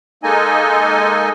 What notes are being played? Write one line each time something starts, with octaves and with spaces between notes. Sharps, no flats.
G#3 A#3 D#4 A4 D#5 G#5